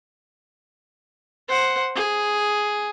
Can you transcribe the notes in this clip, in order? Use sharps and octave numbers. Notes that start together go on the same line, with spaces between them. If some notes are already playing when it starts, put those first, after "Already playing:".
C5 F#5
G#4